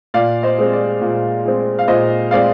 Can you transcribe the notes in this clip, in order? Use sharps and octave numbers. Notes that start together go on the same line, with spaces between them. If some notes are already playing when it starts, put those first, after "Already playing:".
A#2 D5 F5
C5 D#5
G#3 C4
D5
A#2
G#3 C4
F5
A#2 C5 D#5
G#3 C4 D5 F5